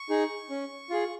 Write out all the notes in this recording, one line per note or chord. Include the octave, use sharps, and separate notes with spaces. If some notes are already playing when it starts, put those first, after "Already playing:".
Already playing: C#6
D#4 G#4
C#4
F4 G#4